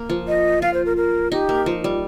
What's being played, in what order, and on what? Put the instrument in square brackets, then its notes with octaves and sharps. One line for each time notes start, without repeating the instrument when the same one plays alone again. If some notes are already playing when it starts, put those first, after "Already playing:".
Already playing: [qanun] A#3
F3
[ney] D#5
[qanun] F4 [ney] F5
[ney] C5
A#4
A#4
[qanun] D#4 [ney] G4
[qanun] A#3
F3
G3